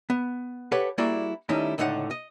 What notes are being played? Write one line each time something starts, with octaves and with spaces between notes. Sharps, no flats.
B3
G4 A4 B4 C#5 F#5
G3 A#3 E4 F#4 G#4 D5
D#3 G3 A3 C#4 D#4 E4
C#2 A2 D3 D#4 F5 F#5
D#5